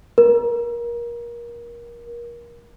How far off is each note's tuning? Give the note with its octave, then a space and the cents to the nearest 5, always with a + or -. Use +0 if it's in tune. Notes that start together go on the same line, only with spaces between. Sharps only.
A#4 +25